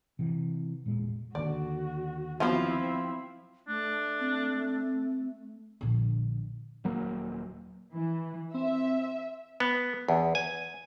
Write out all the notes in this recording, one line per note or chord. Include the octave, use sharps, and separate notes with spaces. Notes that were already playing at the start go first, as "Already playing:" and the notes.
C3 E3
E1 A#2 G#3
D#2 D3 F#4 D5
F3 F#3 B3 C4 E4 F4 C5
A3 D4
C4
A#1 D3
D#1 F#3 A#3
E3
C4 E5
B3
E2
G#5